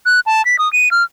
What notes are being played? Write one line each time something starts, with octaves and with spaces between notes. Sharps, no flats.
F#6
A5
B6
D#6
D#7
F6